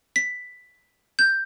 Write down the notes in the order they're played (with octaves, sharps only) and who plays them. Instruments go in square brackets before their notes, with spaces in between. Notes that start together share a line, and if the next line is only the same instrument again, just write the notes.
[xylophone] B6
G6